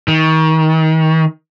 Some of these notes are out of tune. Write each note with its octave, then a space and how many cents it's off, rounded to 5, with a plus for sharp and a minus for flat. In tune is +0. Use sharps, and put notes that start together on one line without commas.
D#3 +35